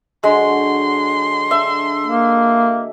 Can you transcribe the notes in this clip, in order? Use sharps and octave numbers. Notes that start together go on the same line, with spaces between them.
D3 F#3 G#3 C6
D4 E5
A#3